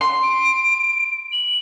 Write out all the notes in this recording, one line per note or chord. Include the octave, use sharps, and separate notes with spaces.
C6
D7
F#7